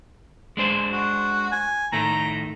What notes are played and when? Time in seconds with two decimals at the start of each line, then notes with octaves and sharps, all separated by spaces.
0.57 G#3 D4 C5
0.92 F#4
1.52 G#5
1.92 A2 D#3 A3 A#5